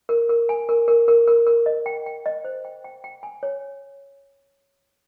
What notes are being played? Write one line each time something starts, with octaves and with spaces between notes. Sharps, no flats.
A#4
A#4
G#5
A#4
A#4
A#4
A#4
A#4
D#5
G5
G5
D#5
C5
G5
G5
G5
G#5
C#5